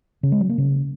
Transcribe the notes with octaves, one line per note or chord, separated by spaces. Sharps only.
C#3
G#3
F#3
A#3
C#3